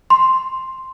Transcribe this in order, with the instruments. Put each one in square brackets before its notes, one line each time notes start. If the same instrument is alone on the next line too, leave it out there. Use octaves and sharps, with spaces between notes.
[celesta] C6